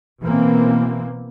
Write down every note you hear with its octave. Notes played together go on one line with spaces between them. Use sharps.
B2 E3 A#3 C4